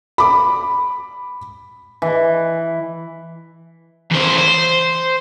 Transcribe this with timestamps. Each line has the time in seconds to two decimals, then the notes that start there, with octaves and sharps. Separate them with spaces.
0.18 B5 D6
2.02 E3
4.11 E2 C5
4.37 C5